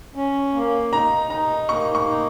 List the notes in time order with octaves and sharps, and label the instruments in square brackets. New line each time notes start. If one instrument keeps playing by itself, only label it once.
[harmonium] C#4
A#3
[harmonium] D#4 [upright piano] A#5
[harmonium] D#4 [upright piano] A#5
[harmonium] A#3 [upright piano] C#6
[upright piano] C#6
[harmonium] D#4